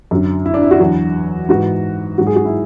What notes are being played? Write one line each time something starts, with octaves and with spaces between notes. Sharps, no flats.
F#2 D3 F#3
E4
D4
E4
F#4
E2 D3 F#3
G#2 E3 F#4
G#2 F#3 F#4
G#4
F#4
E4